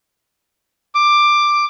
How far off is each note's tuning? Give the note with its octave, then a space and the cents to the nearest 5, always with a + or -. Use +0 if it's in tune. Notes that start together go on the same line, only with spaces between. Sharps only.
D6 +10